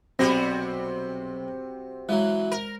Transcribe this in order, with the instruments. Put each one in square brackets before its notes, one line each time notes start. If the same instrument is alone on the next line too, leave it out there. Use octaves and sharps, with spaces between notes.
[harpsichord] B1 [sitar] C3 G3 F#4 [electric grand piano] C4 A#6
[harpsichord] E3 F#3 [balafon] G#3
[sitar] A#4